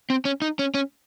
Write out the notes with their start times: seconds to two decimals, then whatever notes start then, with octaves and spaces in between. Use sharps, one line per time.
0.10 C4
0.25 C#4
0.42 D#4
0.59 C#4
0.74 C#4